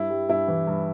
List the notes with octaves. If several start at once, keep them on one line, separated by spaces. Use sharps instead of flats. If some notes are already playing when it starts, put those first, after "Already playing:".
Already playing: G2 E4
G3
G2 E4
E3
G2